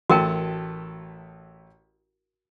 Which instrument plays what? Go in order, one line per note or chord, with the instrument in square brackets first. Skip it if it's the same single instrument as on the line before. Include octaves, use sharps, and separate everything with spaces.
[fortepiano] A1 A3 A5 [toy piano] F#4 A#4 G5